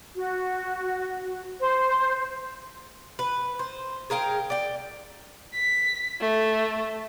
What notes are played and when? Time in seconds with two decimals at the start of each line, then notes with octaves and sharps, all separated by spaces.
0.15 F#4
1.60 C5
3.19 B4
3.59 C5
4.10 G#4 A#4 F5 G5
4.50 D5 G5
5.55 B6
6.21 A3